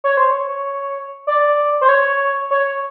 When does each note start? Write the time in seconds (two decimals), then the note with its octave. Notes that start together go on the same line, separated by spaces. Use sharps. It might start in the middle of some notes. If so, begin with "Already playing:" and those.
0.04 C#5
0.17 C5
0.31 C#5
1.27 D5
1.81 C5
1.89 C#5
2.51 C#5